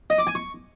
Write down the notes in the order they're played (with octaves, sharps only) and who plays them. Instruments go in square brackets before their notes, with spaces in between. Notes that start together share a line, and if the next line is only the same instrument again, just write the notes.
[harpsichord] D#5
D6
G#5
C#6